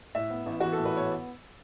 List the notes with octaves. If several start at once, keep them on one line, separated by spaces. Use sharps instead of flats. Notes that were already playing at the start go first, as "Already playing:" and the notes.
A2 E5
B3
A1
E3 F#4
A4
A2
B4
B3 C#5